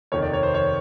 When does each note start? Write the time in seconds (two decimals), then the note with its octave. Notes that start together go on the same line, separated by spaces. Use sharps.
0.12 F1 D#2 D#3 C#5
0.22 D5
0.33 C#5
0.43 C5
0.54 C#5